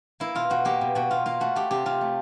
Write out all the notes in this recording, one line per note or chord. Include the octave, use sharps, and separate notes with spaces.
A#3 E4
B2 F4
B2 F#4
A#3 G4
B2
B2 F#4
B2 F4
A#3 F4
A3 F#4
A3 G4
C3 G4
C3 F4
A3